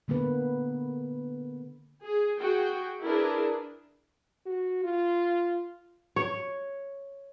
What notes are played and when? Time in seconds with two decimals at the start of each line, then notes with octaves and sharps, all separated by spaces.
0.08 D3 A#3 B3 B4
2.02 G#4
2.39 F#4 G#4 G5
3.03 D4 E4 G#4 A#4 B4
4.46 F#4
4.84 F4
6.16 C#5